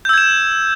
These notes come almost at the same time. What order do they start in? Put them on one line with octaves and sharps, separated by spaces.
G6 E6 G#6 E7